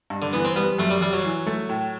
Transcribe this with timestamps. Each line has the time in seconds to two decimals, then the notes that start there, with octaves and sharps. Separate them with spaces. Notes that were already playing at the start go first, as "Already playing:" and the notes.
0.10 G2
0.22 D3
0.33 E3 B3
0.45 C4
0.56 G3 B3
0.79 F#2 A3
0.90 G3
1.01 F#2 G3
1.13 F#3
1.24 E3
1.47 A3
1.69 A2